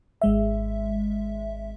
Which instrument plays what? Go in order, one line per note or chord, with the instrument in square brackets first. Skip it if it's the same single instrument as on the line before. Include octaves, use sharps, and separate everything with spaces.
[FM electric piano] G#1 G#3 E5